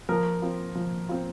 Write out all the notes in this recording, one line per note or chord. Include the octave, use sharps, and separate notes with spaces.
F3 A#4
C4 F4
F3
C4 F4